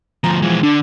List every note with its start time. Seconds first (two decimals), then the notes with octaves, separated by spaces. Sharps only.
0.24 D2 F3 A#5
0.42 E3 F3 G#3
0.63 D3 D4